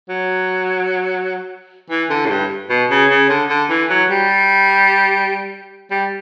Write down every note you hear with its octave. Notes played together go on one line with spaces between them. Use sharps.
F#3
E3
D3
A2
G2
B2
C#3
C#3
D3
D3
E3
F#3
G3
G3